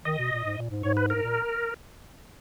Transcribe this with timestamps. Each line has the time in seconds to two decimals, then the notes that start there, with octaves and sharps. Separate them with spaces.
0.05 D#3 D#5
0.19 B2
0.32 A#2
0.45 G#2
0.58 A#2
0.71 G#2
0.83 G#2 C#5
0.97 B4
1.10 G#2 A#4
1.23 A#2